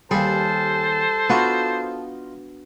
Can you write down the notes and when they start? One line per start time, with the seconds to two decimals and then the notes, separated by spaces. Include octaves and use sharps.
0.11 D#2 G3 G#4 A4 C5 A5
1.29 B3 D4 D#4 F4 F#4